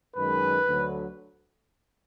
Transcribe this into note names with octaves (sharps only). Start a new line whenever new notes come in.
F#2 D#3 G#3 B4
D2 D3 F#3